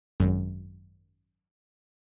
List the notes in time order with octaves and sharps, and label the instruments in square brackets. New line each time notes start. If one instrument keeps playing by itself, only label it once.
[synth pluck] G#1 F#2